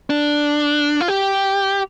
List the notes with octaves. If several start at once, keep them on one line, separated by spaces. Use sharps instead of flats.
D4
F4
G4